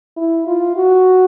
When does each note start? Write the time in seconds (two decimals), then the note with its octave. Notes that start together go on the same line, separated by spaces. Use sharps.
0.16 E4
0.47 F4
0.77 F#4